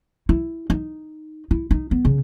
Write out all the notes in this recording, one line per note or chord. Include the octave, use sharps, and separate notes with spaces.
E4
D#4
E4
D#4
B3
C#3